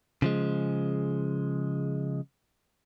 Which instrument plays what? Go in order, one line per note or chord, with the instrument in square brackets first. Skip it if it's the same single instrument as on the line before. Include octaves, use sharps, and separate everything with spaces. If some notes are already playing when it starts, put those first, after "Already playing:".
[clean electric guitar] C#3 F3 G#3